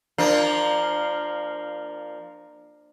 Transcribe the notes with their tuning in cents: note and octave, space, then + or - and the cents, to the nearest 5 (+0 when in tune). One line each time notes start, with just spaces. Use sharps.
F3 -5 A#3 +0 D4 +25